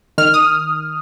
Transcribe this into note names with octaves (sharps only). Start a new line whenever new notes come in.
D#3 F6
D#6